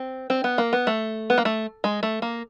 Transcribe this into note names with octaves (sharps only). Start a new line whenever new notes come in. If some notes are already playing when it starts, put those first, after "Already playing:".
Already playing: C4
C4
B3
A#3
B3
A3
B3
A#3
A3
G#3
A3
A#3